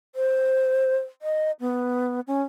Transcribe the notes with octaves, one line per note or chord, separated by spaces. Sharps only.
C5
D#5
B3
C#4